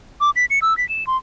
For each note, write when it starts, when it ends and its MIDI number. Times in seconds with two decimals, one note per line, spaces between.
0.21 0.30 86
0.36 0.45 95
0.50 0.59 97
0.62 0.76 88
0.78 0.87 95
0.89 1.06 100
1.07 1.17 84